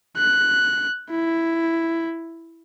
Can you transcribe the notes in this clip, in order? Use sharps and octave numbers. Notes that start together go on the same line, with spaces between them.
F#6
E4